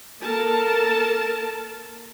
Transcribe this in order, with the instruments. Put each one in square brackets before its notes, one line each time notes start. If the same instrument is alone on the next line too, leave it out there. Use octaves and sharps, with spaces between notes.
[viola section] A#3 A4 A#4 A5